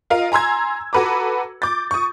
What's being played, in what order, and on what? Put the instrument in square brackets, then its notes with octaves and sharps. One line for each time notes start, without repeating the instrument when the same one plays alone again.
[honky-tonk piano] F4 A#4 D#5 F5
G#5 A#5 C6 E6 G#6
F#4 A4 B4 A#5 D6
D6 G6 A6
C#6 D#6